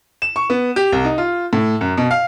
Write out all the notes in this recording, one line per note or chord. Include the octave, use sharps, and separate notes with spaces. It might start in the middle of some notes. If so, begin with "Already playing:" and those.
E7
C#6
B3
G4
C2
D#4
F4
A2
F#2
B2
F5